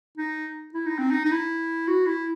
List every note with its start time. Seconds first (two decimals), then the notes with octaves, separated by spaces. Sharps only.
0.18 D#4
0.74 E4
0.86 D#4
0.99 C4
1.11 D#4
1.25 D#4
1.32 E4
1.88 F#4
2.06 E4